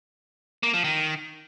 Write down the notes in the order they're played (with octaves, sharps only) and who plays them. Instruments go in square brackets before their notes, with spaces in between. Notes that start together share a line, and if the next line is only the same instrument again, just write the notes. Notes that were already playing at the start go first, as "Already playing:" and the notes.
[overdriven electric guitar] A#3
F3
D#3